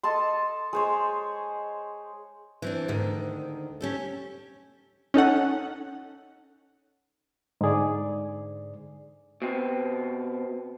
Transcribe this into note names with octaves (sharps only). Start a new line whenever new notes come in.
A4 D#5 A5 C6
G#3 C5 C#5
E3 C4 D4
D2 G#2 D3 D#3
C#4 G4 A4
C#4 D#4 A4 F#5
G#2 D3 G#4 D5
B2 C4